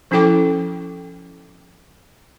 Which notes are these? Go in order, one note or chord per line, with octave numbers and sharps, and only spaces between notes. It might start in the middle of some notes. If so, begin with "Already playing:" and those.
F3 C#4 E4 A4 G5 D6